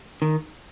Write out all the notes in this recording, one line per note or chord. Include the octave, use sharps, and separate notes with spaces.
D#3